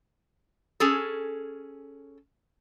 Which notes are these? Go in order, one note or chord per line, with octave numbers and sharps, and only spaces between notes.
C#4 G#4 A4